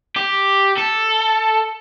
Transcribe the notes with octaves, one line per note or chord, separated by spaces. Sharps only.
G4
A4